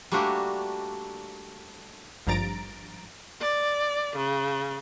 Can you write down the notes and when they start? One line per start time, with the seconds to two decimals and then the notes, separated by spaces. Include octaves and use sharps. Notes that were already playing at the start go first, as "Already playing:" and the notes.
0.12 G3 A3 A#3 D4 F#4 G4
2.27 G#1 G2 F3 A#5 A6 D7
3.39 D5
4.15 C#3